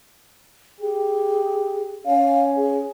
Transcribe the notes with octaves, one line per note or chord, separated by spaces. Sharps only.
G4 G#4
C#4 F5
G#4